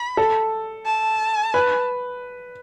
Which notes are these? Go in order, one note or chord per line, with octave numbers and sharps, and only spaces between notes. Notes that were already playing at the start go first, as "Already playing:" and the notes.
Already playing: B5
A4
A5
B4